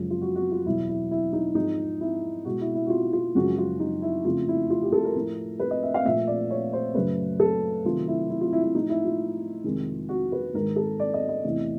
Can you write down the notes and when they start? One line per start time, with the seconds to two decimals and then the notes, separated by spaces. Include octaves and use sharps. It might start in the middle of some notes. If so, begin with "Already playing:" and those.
Already playing: F#2 C#3 F3 G#3
0.10 F4
0.21 F#4
0.36 F#4
0.51 F4
0.65 E2 B2 F#3 E4
0.89 E4
1.11 E4
1.33 D#4
1.55 G#2 F3 G#3 D#4
2.01 E4
2.45 B2 G#3 F#4
2.61 E4
2.75 E4
2.86 F#4
2.90 F4
3.13 F4
3.35 F#2 C#3 F3 G#3 F#4
3.58 F4
3.80 D#4
4.02 E4
4.25 F2 C#3 F3 A3 F4
4.48 E4
4.70 F4
4.82 G4
4.92 A4
5.05 A#4
5.15 A2 F3 A3
5.60 B4
5.71 D#5
5.83 E5
5.94 F5
6.05 A#2 F3 A3 E5
6.27 D5
6.50 C#5
6.73 C5
6.94 F#2 C#3 F#3 A3 B4
7.40 A4
7.84 C3 D#3 F#3 A3 F4
8.08 E4
8.30 E4
8.41 F4
8.53 E4
8.63 E4
8.75 A2 F3 A3 D#4
8.89 E4
9.05 F4
9.64 F2 C3 D#3 G#3
10.09 F#4
10.32 B4
10.54 G#2 D#3 G#3 A#4
10.76 A4
11.00 D5
11.14 D#5
11.29 D#5
11.44 E2 C3 E3 A3